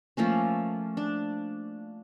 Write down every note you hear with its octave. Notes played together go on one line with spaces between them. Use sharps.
F3 A3 A#3 C#4
D4